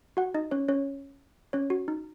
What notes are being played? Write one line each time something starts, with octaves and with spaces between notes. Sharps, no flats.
F#4 F#5
D#4 D#5
C#4 C#5
C#4 C#5
C#4 C#5
F#4
D#4